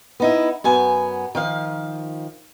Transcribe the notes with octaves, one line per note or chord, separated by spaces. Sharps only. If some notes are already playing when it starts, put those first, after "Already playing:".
B3 D#4 E4
F#2 B3 G#5
D#3 F3 F5